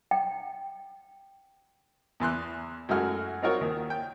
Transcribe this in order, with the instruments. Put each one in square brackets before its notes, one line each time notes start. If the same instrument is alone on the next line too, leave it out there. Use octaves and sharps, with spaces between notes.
[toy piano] G5
[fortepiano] E2 E3 C6 F#6
F#2 G#3 A3 F#4 F6
C4 D#4 F4 F#4 A#4 C#5
D#2 D#3
G5